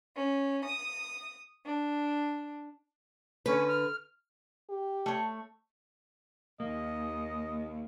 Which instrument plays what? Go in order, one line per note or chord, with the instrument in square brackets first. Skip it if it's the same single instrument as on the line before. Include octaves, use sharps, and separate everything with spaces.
[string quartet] C#4
D#6
D4
[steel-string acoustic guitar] D3 B4 [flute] C#4
[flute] F6
[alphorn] G4
[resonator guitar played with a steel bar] A3 C#5
[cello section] D#2 [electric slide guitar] A#3 [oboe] D#5